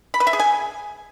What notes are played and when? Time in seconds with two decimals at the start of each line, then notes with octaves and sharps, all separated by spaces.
0.14 B5
0.20 B4
0.27 E5
0.33 G#4
0.40 G#5